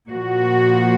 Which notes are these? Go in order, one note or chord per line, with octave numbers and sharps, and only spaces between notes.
A#2 F3 F#4